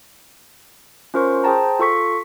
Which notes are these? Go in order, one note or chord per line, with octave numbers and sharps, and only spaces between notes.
C#4 F4 A#4 C5 C#6
G#4 C5 G5 A5 A#5
F4 A4 C#6 B6